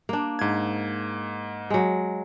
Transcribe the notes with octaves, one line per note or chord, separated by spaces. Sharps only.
A#3 D4
G#2 G#6
F#3 G#3